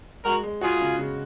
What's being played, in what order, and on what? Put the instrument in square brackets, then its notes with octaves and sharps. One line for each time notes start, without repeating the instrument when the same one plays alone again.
[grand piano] G#3 [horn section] F#4 A#4
[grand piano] G#3
[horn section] F4 G#4 [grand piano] F#4
[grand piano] C#3
C#3